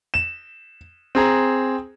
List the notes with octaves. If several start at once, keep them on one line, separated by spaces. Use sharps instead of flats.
E7
C4 G#4 A#5